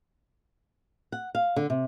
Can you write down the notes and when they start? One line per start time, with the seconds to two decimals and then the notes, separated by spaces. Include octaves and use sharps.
1.12 F#5
1.35 F5
1.56 D3
1.70 C3